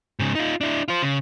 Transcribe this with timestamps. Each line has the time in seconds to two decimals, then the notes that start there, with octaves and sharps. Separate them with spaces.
0.19 G#2 C#3
0.35 D#4 F4
0.61 D4 E4
0.88 F4 C5
1.02 C#3